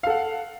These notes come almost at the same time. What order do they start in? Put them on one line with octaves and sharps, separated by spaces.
F5 A4 F#5